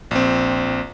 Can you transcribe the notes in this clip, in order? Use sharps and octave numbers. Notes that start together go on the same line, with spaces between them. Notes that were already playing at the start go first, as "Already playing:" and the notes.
A#1 C4